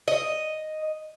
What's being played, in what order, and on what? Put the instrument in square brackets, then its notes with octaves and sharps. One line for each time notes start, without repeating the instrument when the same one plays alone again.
[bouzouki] D#5